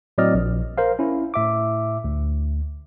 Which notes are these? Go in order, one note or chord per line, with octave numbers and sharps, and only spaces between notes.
A2 F#3 C4 D5 D#5 F6
A#1
A#4 C5 F5
C#4 E4
A2 E5 D6
D2